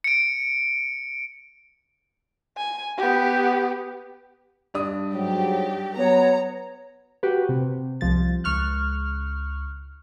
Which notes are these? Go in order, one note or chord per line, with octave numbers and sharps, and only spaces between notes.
C#7 D7
G#5
B3 G4
G2 D4 D#6
G#2 F#3 G4
F#3 B3 C#5 A#5
F#4 G4 B4
C3
C2 F3 A6
C#2 C#6 F6 F#6